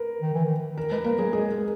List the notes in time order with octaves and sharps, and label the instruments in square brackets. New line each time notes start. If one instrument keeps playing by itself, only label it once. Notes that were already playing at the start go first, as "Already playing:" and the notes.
Already playing: [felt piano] A#4 B4
[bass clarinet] D#3
E3
D#3
[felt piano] A#4
[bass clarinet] G#3 [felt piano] B4
[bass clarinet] A#3 [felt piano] A#4
[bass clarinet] F#3 [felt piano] G#4
[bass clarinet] G#3 [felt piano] G#4
[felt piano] A#4